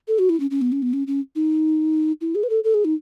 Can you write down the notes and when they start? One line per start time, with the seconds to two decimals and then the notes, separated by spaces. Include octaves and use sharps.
0.08 A4
0.19 F#4
0.29 E4
0.40 C#4
0.51 C#4
0.62 B3
0.72 C#4
0.82 B3
0.93 C#4
1.07 C#4
1.36 D#4
2.21 E4
2.35 G#4
2.43 B4
2.50 A4
2.64 A4
2.74 G#4
2.85 D#4